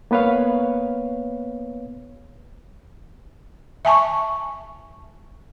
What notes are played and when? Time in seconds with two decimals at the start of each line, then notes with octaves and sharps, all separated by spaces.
0.11 A#3 B3 B4 C#5 F5
3.85 E5 G#5 A5 C#6